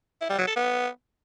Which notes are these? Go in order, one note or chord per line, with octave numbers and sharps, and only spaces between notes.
E4
G3
F#3
A4
B3